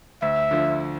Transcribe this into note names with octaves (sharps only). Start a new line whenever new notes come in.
D2 E5
D3 F3